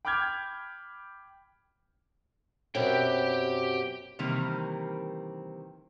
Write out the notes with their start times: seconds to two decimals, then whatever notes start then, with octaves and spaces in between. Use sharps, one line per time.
0.05 G5 B5 D6 F6 G6 G#6
2.75 F#2 B2 C4 G4 G5
4.19 C3 D#3 E3 G3 A#3 C4